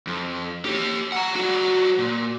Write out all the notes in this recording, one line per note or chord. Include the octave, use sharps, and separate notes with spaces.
F2
G4 C#5
F#5 A#5
G3 F#4
A#2